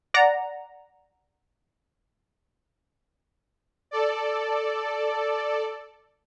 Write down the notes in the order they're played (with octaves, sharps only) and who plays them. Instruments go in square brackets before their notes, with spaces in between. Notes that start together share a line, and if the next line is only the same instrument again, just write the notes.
[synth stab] D5 F#5 A#5
[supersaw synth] A4 D5